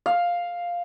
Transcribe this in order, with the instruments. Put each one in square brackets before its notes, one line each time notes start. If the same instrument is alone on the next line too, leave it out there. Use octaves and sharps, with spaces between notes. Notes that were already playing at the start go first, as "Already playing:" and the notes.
[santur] F5